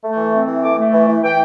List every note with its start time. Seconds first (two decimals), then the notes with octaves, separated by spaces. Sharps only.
0.02 A3
0.17 E3
0.32 C4
0.47 E3
0.62 A3 D6
0.78 A3
0.93 E3
1.07 E3
1.23 E3 G5